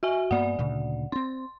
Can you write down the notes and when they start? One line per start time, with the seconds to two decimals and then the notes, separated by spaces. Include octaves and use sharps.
0.03 F#4 E5 G#5
0.31 G2 A#3 B3 D5 F#5
0.59 D2 A#2 C#3
1.12 C4 C#4 C6